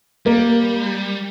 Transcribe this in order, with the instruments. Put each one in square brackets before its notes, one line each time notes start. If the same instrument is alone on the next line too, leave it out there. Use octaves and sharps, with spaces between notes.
[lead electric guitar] G3 [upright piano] A#3